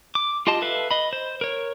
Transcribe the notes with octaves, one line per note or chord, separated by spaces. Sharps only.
D6
F4 G4 D#5 A5 C6
A4 B4 E5 F5
D#5 B5
C5
A#4 C#5